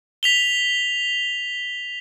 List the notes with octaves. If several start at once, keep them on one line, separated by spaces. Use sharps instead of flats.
B6 F7 G7